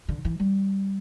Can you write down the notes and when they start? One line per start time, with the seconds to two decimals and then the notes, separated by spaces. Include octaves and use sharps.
0.09 D3
0.25 E3
0.40 G3